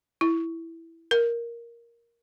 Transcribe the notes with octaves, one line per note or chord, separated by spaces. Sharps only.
E4
A#4